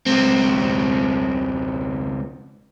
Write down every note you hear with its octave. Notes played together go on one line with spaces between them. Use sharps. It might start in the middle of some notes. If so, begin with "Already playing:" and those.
C#2 C4